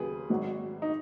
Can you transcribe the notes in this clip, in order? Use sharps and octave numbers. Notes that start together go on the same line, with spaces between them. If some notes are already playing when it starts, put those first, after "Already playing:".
Already playing: D#2 C#3 F#3 G#4 B4
G#1 G#2 F#3
D#4